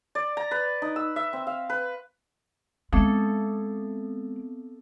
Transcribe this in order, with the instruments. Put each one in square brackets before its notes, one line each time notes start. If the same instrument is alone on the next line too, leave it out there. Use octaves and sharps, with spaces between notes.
[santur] D5
A#5
B4
D#4
E6
E5
C4
F5
B4
[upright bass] G#3 [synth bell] B3 C4 [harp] A4